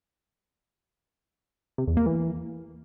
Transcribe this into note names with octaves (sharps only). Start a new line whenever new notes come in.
C3
E2
A#3
E3